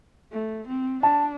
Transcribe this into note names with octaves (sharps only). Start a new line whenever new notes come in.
A3
C4
D4 A5